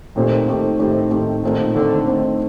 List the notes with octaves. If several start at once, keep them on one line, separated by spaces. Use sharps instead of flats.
A#2 D#3 A3 C4 G4 C5
D#3 A3 C4 G4 C5
A2 D#3 A3 C4 G4 C5
D#3 A3 C4 G4 C5
A#2 D#3 A3 C4
D3 D#3 A3 C4
D#3 A3 C4